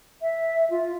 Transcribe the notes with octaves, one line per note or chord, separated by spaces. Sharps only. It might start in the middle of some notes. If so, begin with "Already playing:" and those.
E5
F4